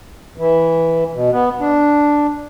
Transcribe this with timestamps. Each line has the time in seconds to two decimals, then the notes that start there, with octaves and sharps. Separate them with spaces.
0.38 E3
1.14 B2
1.32 B3
1.60 D4